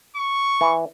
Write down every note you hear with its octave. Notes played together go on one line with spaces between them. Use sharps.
C#6
E3